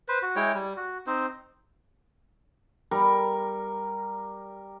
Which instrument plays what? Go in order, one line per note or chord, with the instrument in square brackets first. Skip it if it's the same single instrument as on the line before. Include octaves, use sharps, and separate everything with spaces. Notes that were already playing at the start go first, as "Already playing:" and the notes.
[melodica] B4 C5
F#4
G#3 E4 C#5 G5
G3
F#4
C4 D#4 C5
[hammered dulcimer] G3 A#4